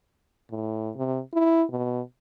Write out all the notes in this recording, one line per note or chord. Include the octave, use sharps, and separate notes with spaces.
A2
C3
E4
B2